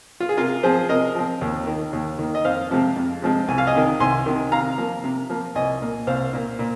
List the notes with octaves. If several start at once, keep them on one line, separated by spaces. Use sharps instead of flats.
F4
G#4
C3 F4 A#4
F3 C4 G#4 C5
C3 A#4 D#5
F3 C4
D#2
D#3 A#3
D#2
D#3 A#3
D#5
F2 C5 F5
C3 F3 G#3 C4
F2
C3 F3 G#3 C4
C2 G#5
F5
D#5 G#5
C3 D#3
C2 G#5 C6
C3 D#3
C3 F5 A#5
F3 A#3
C3
F3 A#3
C2 D#5 G#5
A#2 A#3
C2 C5 F5
A#2 A#3
A#2